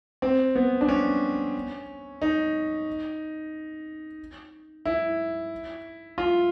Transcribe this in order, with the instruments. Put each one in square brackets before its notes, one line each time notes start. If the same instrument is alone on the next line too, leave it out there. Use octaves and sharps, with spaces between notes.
[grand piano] C4
B3
D4
C#4
D#4
E4
F4